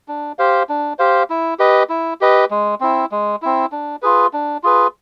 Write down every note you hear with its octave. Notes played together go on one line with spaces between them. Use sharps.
D4
G4 C5 F5
D4
G4 C5 F5
E4
G4 B4 D#5
E4
G4 B4 D#5
G#3
C4 E4
G#3
C4 E4
D4
F4 G#4 B4
D4
F4 G#4 B4